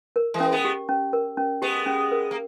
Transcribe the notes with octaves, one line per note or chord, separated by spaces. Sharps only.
A#4
E3 G#3
C#4
G#3 B3
G4
C#4
A#4
C#4
G#3 B3 G4
C#4
A#4
A#3